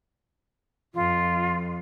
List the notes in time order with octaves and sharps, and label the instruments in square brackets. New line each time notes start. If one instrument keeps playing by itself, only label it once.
[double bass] F2 [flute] F4